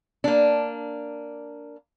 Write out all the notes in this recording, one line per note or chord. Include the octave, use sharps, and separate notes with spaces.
A#3 D4